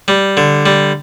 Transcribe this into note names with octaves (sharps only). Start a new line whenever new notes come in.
G3
D3
G3